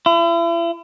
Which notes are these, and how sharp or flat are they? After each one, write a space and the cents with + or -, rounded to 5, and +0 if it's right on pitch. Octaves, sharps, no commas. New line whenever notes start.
E4 +40